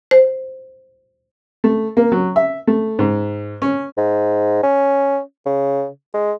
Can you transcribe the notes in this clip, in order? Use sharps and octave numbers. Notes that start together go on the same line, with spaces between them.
C5
A3
A#3
F#3
E5
A3
G#2
C#4
G#2
C#4
C#3
G#3